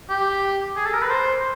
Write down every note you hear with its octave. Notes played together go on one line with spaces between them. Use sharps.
G4
G#4
A4
A#4
B4
C5